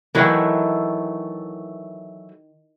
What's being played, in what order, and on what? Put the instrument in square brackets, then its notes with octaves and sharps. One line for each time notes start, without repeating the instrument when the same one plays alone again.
[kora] D#3 E4 G4 [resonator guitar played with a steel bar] E3 F#3 A3